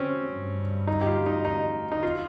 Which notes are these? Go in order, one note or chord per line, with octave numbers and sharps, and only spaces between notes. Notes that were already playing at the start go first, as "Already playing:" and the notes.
Already playing: C4 C#4
G2
D#4
G4
F4
D#4
D#4
D#4
F4